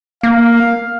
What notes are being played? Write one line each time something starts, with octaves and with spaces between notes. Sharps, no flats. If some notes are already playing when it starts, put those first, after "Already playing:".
A#3 F5